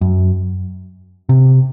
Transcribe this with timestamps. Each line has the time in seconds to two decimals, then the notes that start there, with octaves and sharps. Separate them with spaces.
0.01 F#2
1.29 C3